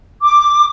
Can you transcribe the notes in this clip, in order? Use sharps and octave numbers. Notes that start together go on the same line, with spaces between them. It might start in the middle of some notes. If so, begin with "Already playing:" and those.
D6